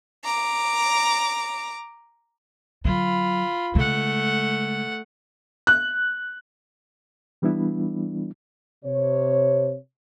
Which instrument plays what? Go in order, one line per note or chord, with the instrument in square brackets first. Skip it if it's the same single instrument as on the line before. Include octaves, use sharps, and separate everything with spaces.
[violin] A#5 D6
[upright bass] D3 F#3 [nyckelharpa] F4 B5
[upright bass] C#3 G#3 [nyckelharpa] A3 F#5
[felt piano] F#6
[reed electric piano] E3 G3 B3 D4 E4
[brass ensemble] C3 C#5